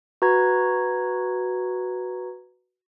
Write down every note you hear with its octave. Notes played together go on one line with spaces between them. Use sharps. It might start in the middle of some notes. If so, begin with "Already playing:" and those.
F#4 B4 A#5 G#6